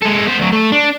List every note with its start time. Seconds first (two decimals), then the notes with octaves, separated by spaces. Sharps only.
0.02 G#3 A4
0.27 B3 C5
0.39 D2 F#3
0.53 A3
0.72 D4